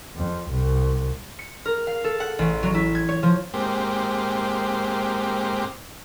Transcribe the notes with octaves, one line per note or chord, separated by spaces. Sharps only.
F2
C2
C#7
A#4
F5
A4
F#5
A1
F#3
E4
G#6
C#5
F3
G#2 A#3 C4 G4